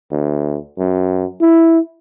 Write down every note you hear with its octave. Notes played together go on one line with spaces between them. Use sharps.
D2
F#2
E4